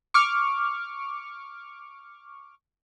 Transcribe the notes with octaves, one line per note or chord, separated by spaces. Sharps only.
C#6 D6 F6